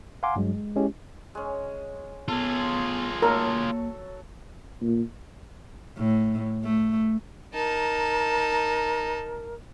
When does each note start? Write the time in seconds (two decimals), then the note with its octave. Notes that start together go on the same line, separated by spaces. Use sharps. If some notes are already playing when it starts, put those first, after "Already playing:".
0.23 F5 F#5 G#5 A#5 C6 D6
0.36 G2 F#3 G#3
0.54 G#3
0.76 G#3 C#4 E4 G4
1.35 G#3 C#4
2.28 B3 F4 G#4 A4
3.22 F#3 A#3 A4 A#4 C#6
4.81 A#2
5.98 A2
6.64 A3
7.54 D#4 A#4 A5